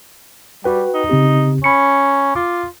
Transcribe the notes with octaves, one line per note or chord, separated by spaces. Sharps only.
G3 F#4 B4 G5
D#4
C#3 C4 G4
C#4 B5 C#7
F4 D6